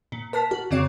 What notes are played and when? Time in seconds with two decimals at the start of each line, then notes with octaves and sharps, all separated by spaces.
0.12 A#2
0.33 A#4 A5 F6 B6
0.51 F#4
0.71 F2 C#3 C4 C#5 D6